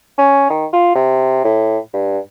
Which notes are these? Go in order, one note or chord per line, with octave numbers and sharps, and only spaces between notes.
C#4
D#3
F4
C3
A2
G2